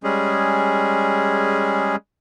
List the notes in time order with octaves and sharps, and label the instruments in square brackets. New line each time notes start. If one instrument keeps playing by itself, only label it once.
[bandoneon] G3 G#3 C#4 G#4